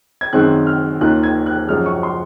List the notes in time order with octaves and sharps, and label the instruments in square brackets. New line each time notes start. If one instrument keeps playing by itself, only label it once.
[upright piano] G#6
F#2 D#3 G#3 C4 F#6
F6
D#2 D#3 A#3 C#4 F4 F#6
G#6
F#6
F#2 F3 G#3 F6
C#6
C6